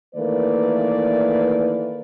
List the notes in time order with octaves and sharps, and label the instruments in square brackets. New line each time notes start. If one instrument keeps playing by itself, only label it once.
[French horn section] D#3 E3 A3 A#3 B4 D5